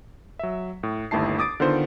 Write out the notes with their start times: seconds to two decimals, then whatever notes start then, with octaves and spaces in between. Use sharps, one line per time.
0.39 F#3 E5
0.83 A2
1.11 G1 D#2 A3 E4 A5 C7
1.39 D6 D#6 A6 D7
1.60 D3 D#3 B3 F4 C5